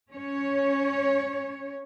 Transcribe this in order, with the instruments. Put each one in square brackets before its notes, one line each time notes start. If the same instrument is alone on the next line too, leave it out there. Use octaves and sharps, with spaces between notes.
[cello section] C#4 C#5